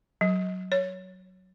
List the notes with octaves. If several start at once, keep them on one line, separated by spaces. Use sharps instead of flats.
F#3
C#5